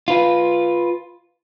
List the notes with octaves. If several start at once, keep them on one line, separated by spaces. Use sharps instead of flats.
F4 B4